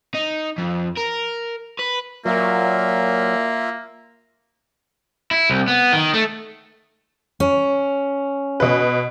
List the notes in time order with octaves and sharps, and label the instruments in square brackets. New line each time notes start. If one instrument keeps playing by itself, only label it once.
[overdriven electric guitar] D#4
F2
A#4
B4
[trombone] A#2 [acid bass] F#3 [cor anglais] A#3 [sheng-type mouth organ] F4 E5
[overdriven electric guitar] E4
C2
B3
D#3
A3
[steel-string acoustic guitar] C#4
[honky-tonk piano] B2 B4